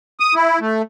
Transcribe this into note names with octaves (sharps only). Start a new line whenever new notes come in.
D#6
E4
A3